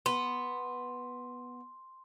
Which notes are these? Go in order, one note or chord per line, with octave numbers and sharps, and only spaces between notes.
B3 C6